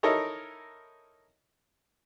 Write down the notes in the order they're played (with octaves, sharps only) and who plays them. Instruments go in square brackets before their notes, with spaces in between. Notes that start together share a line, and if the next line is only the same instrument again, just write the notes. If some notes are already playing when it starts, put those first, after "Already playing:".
[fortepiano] D#4 E4 A4 A#4 C#5 D#5